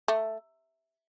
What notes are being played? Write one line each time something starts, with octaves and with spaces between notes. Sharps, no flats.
A3